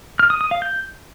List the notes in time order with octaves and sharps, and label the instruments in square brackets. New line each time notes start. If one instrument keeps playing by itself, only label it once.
[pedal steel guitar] F6
D#6
D#6
F5
G6